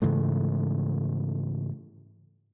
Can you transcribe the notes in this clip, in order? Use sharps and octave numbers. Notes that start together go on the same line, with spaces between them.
G#2 C#3 E3 A3